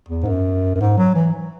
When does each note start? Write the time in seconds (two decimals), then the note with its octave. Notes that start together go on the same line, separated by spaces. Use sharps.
0.09 E2
0.23 G#2
0.26 F#2
0.75 F#2
0.80 G#2
0.97 F#3
1.15 E3